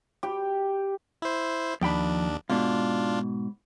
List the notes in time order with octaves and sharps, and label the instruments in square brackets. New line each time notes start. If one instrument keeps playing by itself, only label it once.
[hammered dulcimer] G4
[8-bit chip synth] E4 C5
[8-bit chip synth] D#2 D4 [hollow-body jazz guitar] F3 G5 B5
[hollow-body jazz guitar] G#2 B2 [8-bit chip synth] D4 F4